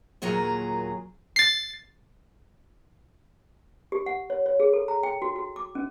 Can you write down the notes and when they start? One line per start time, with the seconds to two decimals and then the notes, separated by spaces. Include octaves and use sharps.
0.22 D#2 A#2 F#3 G#4 A#5
1.36 A6 C7
3.92 G4
4.06 F#5
4.30 C#5
4.46 C#5
4.60 G#4
4.73 A4
4.88 A#5
5.03 G5
5.22 F#4
5.36 F#4
5.56 D6
5.75 C#4